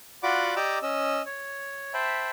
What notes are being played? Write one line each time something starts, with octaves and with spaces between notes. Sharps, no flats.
F4 F#4 D5 F#5 B5 D6
G4 D5 D#5 A#5 D6 E6
C#4 D#5 E6
C#5
C5 E5 G5 A5 B5